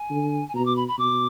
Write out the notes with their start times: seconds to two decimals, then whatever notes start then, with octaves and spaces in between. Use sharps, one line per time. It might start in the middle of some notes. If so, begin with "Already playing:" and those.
Already playing: G#5
0.10 D3
0.48 G#5
0.54 B2 A#5
0.65 D6
0.76 B5
0.88 B5
0.98 B2 D6